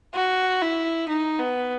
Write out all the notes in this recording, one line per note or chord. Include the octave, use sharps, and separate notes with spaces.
F#4
E4
D#4
B3